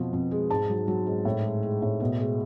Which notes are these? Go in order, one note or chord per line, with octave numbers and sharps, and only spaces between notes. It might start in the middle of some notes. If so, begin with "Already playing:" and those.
Already playing: F2 B2 F3
F2
G#3
G#2 A5
F#3
F#3
G#2
A2
G#3
G#3
A2
B2
G#3